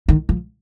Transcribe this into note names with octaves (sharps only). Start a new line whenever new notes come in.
D#3
F3